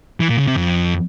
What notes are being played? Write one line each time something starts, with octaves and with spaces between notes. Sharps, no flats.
E3
A#2
C#3
C3
F2